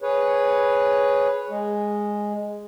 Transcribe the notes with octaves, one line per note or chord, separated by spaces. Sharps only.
G#4 B4 C#5
G#3